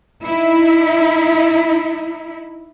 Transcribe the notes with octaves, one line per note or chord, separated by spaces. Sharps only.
D#4 E4